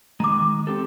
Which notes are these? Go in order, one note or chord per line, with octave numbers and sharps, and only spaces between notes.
D#3 G#3 A#5 D6
C4 G4 A4